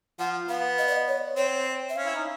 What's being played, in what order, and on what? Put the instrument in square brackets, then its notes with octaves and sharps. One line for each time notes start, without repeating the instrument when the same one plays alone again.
[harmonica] F3 [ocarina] F#5
[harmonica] B3 [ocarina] F5
[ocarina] D#5
D5
D#5
C#5
[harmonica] C4 [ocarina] C#5
[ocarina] E5
[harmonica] C#4 [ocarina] F5
[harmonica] E4
D#4